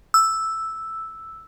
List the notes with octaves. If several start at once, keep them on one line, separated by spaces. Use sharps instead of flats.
E6